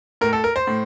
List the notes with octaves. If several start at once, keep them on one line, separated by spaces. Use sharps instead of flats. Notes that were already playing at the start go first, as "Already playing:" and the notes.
A2 A#4
A4
A#4
C5
A2